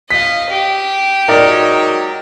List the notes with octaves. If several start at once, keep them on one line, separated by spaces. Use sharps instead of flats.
D#5 F5 B6
G4
F#3 G#3 D#4 A#4 D5